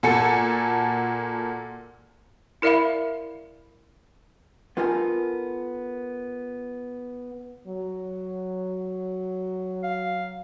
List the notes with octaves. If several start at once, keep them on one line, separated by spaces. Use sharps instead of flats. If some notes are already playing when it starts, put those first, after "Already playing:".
A#2 F#4 A4 G#5 C#7
E4 A#4 D5 E5 F5 B5
B3 D#4 F4 A4 A#4 G#5
F#3
F5